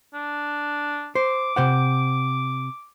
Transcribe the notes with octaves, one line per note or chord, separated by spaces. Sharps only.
D4
C5 D6
C3 C5 F#5